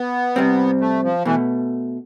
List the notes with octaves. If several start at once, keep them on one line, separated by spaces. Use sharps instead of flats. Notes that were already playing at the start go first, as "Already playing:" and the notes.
Already playing: B3
C3 G3 C4
A3
F3
B2 E3 A3